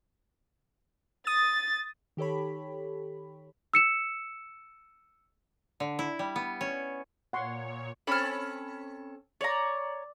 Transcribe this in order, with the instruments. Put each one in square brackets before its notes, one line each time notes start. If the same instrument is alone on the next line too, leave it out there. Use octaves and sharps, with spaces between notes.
[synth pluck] D#6 [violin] A6
[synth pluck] D#3 G4 A4 C#5 B5
[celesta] E6 C#7 E7
[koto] D3
E4
G3
B3
C#4
[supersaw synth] A#2 C#5 [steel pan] F#5 C6 C#6
[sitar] C4 C#4 A4 [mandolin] B5 F6
[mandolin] C#5 A#5 [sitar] D5